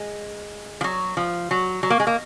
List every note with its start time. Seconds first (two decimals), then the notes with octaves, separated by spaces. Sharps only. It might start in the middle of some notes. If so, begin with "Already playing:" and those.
Already playing: G#3
0.81 F3
0.84 F#3
1.17 F3
1.51 F#3
1.83 F#3
1.90 A#3
2.00 G#3
2.07 A#3